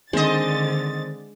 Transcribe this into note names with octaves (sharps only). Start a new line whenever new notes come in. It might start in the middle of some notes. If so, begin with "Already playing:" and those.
D3 D#3 G#3 C4 C5 D#5 A6